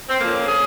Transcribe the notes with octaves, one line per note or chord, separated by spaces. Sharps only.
C4
F2 C#3 F3 A#3
G#4